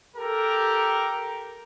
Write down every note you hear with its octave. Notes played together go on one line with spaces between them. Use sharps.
G4 A4 A#4